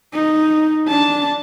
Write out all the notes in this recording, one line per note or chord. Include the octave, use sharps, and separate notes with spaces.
D#4
D4 A5